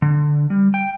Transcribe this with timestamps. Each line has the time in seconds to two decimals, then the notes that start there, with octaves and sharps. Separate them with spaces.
0.02 D3
0.50 G3
0.74 G5